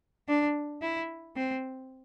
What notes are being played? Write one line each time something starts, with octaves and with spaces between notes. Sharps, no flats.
D4
E4
C4